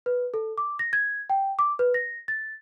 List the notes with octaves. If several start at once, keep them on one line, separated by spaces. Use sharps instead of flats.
B4
A4
D6
A#6
G#6
G5
D6
B4
A#6
A6